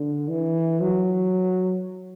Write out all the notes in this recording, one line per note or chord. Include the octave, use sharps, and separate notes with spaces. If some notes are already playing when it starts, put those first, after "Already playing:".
Already playing: D3
E3
F#3